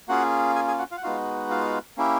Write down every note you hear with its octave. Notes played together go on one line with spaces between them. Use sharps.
A#3 C#4 F4 F#4 G#4 F#5
G#4 G#5
G#4 G#5
F#4 F#5
F4 F5
F#5
G#3 B3 D#4 F4 F#4 F5
F4 F5
A#3 C#4 E4 G4